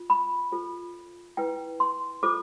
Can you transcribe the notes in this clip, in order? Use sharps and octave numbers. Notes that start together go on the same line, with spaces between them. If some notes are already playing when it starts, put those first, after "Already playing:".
Already playing: F4
B5
F4 A4 C5
E4 B4 G5
C6
F4 A4 C5 D6